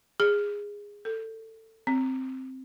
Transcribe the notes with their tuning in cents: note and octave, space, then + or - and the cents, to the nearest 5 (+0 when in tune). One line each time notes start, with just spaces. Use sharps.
G#4 -15
A4 +20
C4 +0